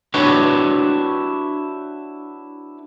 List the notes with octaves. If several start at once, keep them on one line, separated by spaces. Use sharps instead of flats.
D4 E4 F#4 G4 B4 C#5